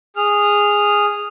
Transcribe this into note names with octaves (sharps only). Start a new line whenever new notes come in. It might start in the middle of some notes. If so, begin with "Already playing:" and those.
G#4 F6